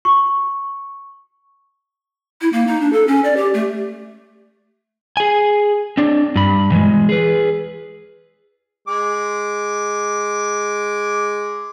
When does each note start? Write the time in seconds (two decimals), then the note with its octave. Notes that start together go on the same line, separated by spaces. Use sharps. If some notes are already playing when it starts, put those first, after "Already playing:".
0.05 C#6
2.41 E4
2.53 A#3
2.67 D#4
2.81 D4
2.93 A4
3.07 C#4
3.24 D5
3.37 G4
3.54 A3
5.17 G#4 G#5
5.97 C4 D4
6.36 G2 B5
6.72 E3 G#3
7.09 G#4 B4
8.88 G#3 D6